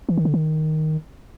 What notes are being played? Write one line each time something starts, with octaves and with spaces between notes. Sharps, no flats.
E3
D#3
D3
D#3